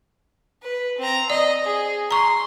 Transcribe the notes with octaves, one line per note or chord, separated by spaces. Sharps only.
B4
C4 A#5
D5 D#5
G#4
A#5 C6 C#6